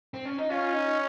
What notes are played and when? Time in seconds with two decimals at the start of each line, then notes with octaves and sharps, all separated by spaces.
0.14 C4
0.25 C#4
0.38 D#4
0.50 C#4 F4
0.73 D#4